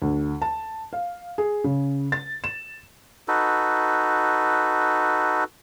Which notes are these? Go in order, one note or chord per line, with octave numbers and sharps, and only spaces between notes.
D2
A5
F5
G#4
C#3
A6
E7
D#4 F#4 A4 B4